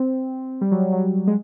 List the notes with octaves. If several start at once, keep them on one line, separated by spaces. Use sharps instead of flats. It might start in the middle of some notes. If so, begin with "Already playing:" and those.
Already playing: C4
G3
F#3
F#3
G#3